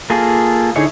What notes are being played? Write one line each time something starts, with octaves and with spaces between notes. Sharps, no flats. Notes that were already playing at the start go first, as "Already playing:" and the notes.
A#3 F4 G#4 A4
D3 D#4 E4 G#4 C#5